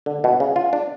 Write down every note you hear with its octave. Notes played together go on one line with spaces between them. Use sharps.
D3
B2
C#3
F4
D4